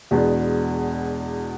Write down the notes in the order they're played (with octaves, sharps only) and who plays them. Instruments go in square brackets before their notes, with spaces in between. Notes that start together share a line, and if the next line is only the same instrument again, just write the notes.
[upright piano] E2 B2 G#3 B3 D4